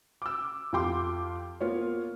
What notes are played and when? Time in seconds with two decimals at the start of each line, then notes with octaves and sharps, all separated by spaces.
0.22 D6 E6
0.73 F2 F4 G4 G5 C6 D6
1.60 A#3 B3 F4 C5 C#5